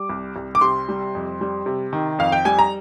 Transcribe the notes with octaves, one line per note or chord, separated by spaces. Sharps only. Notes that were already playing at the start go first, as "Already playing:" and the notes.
Already playing: G3 D6
C2
C2
D6
C3 C6
G3
F2
G3
C3
D#3
F2 F5
G5
G3 G#5
A#5